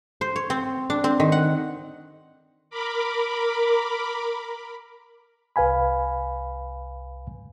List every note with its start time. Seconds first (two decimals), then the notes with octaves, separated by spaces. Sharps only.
0.21 C5
0.36 C#5
0.50 C4
0.90 D4
1.04 C4
1.20 D#3
1.32 F#5
2.70 A#4 B5 D6
5.56 C2 B4 F5 G#5 B5